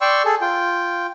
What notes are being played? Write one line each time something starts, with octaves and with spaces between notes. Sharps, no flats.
D5 G5 C6 C#6 E6
G#4 A4
F4 G5